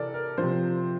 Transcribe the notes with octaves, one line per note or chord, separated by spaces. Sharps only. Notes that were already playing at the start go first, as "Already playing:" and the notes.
Already playing: C3 E3 A4 A#4 D5
A#4
C3 F3 C5